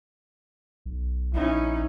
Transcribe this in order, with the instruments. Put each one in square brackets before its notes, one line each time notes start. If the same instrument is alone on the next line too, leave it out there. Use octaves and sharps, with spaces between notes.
[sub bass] B1
[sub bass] A#1 [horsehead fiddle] C#4 D#4 [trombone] E4